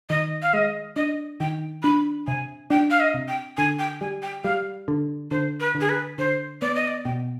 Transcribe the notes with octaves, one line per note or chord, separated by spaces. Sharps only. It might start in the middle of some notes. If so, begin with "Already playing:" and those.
D#3 D#5
F5
G#3 D#5
D4 D#5
D#3 G5
D4 B5
C3 G#5
D4 G5
F5
D#5
C3
G5
D3 G#5
G5
G3 G#5
G5
G3 F5
D3
D3 C5
B4
D3
G#4
B4
D3 C5
B3 D5
D#5
D5
B2 G5